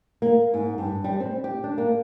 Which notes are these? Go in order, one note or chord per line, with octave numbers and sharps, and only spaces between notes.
A#3
G#2
G2
G3
C4
G4
D4
A#3